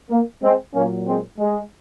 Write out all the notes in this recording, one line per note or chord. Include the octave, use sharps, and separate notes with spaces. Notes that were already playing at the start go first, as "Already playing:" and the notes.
A#3
G#3 C4
A#2 F#3 A#3 C#4
G#3 C4
G#3